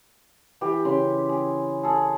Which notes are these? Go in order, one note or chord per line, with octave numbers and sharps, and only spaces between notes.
E3 G4
C#3 C6
G#4
G#4 A4